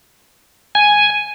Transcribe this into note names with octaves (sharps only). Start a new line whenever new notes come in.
G#5